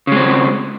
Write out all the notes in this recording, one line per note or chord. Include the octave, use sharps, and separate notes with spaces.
C#3 G#3 C4